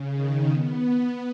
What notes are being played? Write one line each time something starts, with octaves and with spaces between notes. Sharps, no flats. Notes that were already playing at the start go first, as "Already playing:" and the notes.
Already playing: C#3
D#3
B3